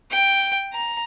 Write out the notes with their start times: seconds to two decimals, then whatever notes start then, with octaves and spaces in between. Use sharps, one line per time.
0.11 G5
0.73 A#5